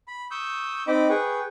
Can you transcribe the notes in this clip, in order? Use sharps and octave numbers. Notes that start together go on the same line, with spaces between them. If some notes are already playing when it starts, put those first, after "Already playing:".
B5
C#6 D#6 E6 G6
C4 D#4 D#5 B5 D6
G#4 B4 G5 C#6